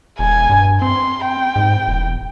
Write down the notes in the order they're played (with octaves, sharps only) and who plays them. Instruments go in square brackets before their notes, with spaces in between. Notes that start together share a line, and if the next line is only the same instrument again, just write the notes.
[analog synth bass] E1 [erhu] G#5
[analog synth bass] G2
[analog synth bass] C4 [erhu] C6
[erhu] G5
[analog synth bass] G#2
E1